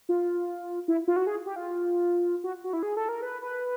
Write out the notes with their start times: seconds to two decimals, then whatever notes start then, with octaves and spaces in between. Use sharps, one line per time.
0.09 F4
0.88 E4
1.08 F4
1.16 F#4
1.27 G#4
1.46 G4
1.56 F4
2.44 F#4
2.64 F#4
2.73 E4
2.83 G#4
2.97 A4
3.09 A#4
3.22 B4
3.42 B4